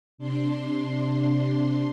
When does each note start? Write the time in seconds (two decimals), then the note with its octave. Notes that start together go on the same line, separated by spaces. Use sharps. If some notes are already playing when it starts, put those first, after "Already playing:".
0.18 C3 D4 C6